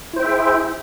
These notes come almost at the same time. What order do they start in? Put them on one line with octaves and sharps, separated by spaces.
E4 C5 G5 E5 G#4